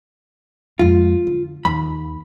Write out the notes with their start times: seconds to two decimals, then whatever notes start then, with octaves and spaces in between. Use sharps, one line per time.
0.79 F2 G#3 F4
1.27 D3
1.65 D#2 B5